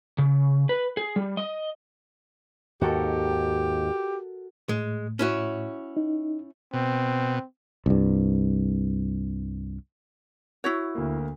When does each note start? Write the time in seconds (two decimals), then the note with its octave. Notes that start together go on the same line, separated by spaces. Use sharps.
0.18 C#3
0.69 B4
0.97 G#4
1.16 G3
1.37 D#5
2.81 D#2 G#2 D#3 F#4 G4 A4 A#4
4.69 A2 G#3
5.19 C#4 E4 F#4
5.97 D#4
6.73 B2 C4
7.86 C2 G2
10.64 E4 F#4 C#5
10.95 D2 A#3